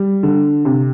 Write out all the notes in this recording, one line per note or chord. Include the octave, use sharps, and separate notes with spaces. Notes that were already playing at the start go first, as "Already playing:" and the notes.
Already playing: G3
D3
C3